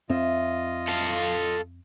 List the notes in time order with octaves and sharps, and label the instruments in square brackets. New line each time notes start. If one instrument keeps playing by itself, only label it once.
[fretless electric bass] F2 C4 [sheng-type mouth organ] F4 D#5 [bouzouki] E5
[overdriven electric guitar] A4 F5